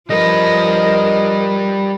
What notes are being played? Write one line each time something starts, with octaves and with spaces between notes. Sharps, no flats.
F3 G3 A#4 B4 D#5